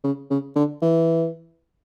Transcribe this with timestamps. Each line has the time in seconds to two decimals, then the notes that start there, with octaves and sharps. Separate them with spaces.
0.04 C#3
0.30 C#3
0.56 D3
0.82 E3